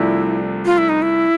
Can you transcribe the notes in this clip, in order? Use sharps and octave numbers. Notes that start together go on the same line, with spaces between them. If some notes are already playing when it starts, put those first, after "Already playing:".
Already playing: C2 C3 F3 A3 D4 E4
F4
E4
D#4
E4